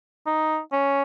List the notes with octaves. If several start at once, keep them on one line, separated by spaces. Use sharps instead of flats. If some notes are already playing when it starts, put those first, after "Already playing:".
D#4
C#4